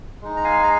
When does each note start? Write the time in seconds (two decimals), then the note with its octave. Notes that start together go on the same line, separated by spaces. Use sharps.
0.21 G#3 D#4
0.36 A#5
0.44 F5 G#5
0.63 A#5